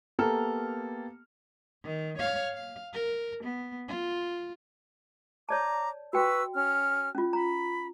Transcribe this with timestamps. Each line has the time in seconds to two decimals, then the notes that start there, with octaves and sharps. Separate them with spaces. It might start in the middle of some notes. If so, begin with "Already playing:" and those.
0.19 A#3 B3 G4 A4 A#5 F6
1.84 D#3
2.18 C#5 F5
2.53 F5
2.94 A#4
3.44 B3
3.88 F4
5.49 C#5 D5 A5 A#5 D6
6.13 F#4 B4 G5 C#6 E6
6.54 C#4 F6
7.15 C#4 F4
7.33 A#5 B5